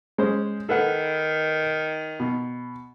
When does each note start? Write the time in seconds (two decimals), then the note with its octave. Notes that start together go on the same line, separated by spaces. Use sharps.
0.18 G#3 C#4 C5
0.69 D#3 A4 B4 F#5
2.20 B2